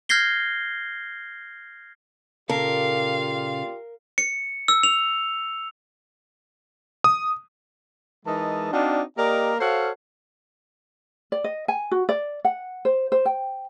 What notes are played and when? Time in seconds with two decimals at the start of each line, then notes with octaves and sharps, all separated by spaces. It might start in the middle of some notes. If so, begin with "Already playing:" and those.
0.09 F6 G6 G#6 A#6 C7 G7
2.50 A#2 C#3 F4 G4 A4 A#4 D5 F5
4.18 C#7
4.68 E6
4.83 F7
7.04 D#6
8.26 E3 G#3 D#4 A#4 D#5 A5
8.72 C4 D4 D#4 F#4 D5 F5
9.18 A#3 G4 A#4 D5 D#5
9.59 F#4 A4 C5 C#5 F5
11.32 D5
11.44 D#5
11.68 G#5
11.91 F#4
12.09 D5
12.45 F#5
12.85 C5
13.12 C5
13.25 G5